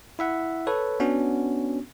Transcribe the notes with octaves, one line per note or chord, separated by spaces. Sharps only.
E4 E5 F#5
A4 B4 C#5
B3 C#4 D4 F#4